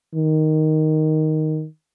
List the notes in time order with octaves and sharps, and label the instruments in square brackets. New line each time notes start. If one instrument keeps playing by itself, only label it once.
[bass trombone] D#3